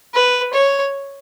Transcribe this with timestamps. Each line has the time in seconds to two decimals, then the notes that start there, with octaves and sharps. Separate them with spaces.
0.14 B4
0.53 C#5